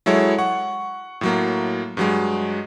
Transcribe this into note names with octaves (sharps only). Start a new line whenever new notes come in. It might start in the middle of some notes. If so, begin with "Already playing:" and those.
F#3 G#3 E4 A4 C#5
F#5 C#6
A2 F#3 A#3
G2 F#3 G#3